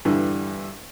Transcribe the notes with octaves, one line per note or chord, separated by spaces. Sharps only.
G2 D3 E3